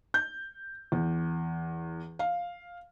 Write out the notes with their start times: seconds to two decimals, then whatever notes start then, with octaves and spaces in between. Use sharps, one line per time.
0.14 G6
0.92 E2
2.19 F5